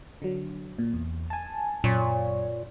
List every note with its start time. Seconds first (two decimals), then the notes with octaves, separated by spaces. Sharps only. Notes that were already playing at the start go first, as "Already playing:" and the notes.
0.22 D3 F#3
0.79 A#2
0.93 E2
1.30 G#5 A5
1.84 F#2 A#2 C#5